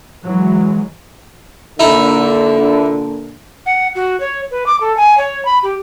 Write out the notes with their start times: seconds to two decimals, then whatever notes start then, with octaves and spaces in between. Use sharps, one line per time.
0.24 E3 F#3 G#3
1.79 A#2 D3 D#4 E4
3.66 F#5
3.95 F#4
4.20 C#5
4.51 B4
4.66 D6
4.80 A4
4.97 G#5
5.18 C#5
5.45 B5
5.63 G4